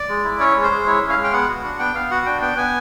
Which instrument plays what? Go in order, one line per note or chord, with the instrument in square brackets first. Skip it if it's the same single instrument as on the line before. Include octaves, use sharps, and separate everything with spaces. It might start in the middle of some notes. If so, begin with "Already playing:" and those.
Already playing: [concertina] D5
G#3
E4
C#4 C#5
G#3
C5
G#3
E4 C#5
C#4
F5
G#3
G5
B3 F#5
F#4
D4
B3 G5
B3 F5
F#4 F#5
D4 G5
B3 G5
B3 G#5